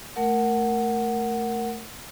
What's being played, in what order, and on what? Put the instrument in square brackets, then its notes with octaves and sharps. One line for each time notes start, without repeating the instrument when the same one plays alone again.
[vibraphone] A3 A#4 F#5